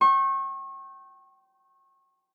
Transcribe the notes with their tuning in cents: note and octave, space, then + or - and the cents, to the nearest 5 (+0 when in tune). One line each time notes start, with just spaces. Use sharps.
G5 -30 C#6 -35